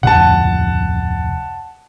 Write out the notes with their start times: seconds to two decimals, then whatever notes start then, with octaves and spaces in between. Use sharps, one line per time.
0.03 D1 F2 C3 F#5 A5